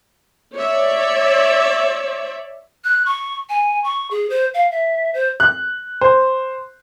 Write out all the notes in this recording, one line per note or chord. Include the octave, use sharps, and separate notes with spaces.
C#5 D5 E5
F#6
C#6
G#5
C#6
G#4
C5
F5
E5
C5
F#6
C5